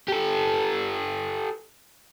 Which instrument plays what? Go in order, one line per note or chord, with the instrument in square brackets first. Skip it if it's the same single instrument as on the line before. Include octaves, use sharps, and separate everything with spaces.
[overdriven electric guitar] G4 A4